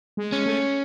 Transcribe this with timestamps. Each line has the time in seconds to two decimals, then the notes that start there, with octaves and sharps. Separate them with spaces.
0.17 G#3
0.32 C#4
0.46 A3